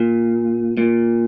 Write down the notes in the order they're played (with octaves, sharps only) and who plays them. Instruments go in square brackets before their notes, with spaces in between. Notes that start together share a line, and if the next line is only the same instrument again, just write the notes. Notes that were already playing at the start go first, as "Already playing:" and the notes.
Already playing: [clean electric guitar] A#2
A#2